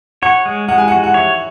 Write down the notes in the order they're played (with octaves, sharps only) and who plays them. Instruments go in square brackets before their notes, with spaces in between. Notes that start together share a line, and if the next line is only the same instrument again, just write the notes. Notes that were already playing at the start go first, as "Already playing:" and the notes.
[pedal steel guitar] C#5 [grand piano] F#5
[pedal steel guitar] G#3
[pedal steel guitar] G#3 [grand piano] F#5
[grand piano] G#5
[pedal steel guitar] F#4 [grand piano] F#5
[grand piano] F#5
[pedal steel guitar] C#5 [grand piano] E5